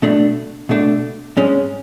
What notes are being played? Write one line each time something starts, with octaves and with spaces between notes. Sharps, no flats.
B2 A3 D4
B2 A3 D4
G#2 G#3 C#4